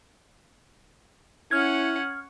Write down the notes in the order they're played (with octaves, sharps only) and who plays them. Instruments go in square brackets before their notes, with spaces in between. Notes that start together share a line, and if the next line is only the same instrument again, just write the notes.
[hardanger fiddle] C#4 F#5 [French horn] E4 [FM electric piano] F6 G#6